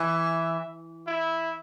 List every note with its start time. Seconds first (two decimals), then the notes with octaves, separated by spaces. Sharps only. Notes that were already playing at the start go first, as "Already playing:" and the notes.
Already playing: E3 E5
1.07 E4